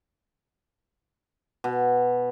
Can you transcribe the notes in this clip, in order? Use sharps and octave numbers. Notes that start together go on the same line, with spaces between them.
B2